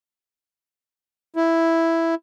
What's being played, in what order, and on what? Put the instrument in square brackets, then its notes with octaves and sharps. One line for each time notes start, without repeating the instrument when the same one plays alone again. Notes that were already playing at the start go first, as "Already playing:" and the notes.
[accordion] E4